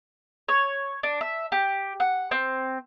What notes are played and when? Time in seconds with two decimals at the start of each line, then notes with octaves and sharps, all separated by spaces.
0.48 C#5
1.03 D4
1.21 E5
1.52 G4
2.00 F#5
2.31 C4